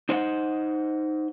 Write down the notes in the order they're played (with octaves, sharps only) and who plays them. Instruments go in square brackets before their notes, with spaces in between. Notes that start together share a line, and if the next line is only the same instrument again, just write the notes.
[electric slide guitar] D#4 C5 D#5 F5 F#5